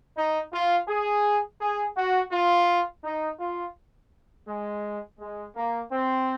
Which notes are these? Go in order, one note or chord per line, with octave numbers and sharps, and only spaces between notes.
D#4
F4
G#4
G#4
F#4
F4
D#4
F4
G#3
G#3
A#3
C4